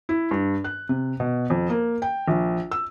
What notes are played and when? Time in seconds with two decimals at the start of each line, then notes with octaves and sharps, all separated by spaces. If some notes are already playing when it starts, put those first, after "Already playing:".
0.09 E4
0.31 G2
0.64 F#6
0.89 C3
1.20 B2
1.50 F2
1.70 A#3
2.02 G5
2.28 A#1
2.71 E6